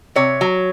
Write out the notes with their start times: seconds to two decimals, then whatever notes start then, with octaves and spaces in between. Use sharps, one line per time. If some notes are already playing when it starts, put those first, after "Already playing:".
0.16 C3 C#5
0.41 F#3